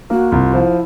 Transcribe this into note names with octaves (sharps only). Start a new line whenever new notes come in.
A#3 F#4
C2 F4
F3 E4